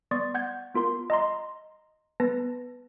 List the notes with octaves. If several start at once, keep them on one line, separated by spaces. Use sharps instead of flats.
B3 D5 C6 C#6 D#6 A6
F#5 G6 G#6
B3 F4 A#4 C6
D#5 A#5 C6
B3 B4 A5 A#6